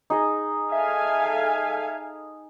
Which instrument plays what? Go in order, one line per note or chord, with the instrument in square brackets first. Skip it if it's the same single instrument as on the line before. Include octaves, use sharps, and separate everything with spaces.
[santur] D#4 G#4 D#5
[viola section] A4 F5 G#5 [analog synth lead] E5